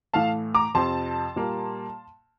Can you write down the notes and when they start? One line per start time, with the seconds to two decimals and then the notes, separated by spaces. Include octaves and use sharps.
0.13 A2 E3 A3 F5 A5
0.55 A#5 D6
0.75 F2 C3 F3 C4 A5 C6
1.36 A#2 G3 A#3